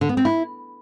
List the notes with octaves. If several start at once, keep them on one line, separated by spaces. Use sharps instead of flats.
D3
B3
C4
E4